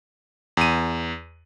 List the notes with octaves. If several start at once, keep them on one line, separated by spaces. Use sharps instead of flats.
E2 D#7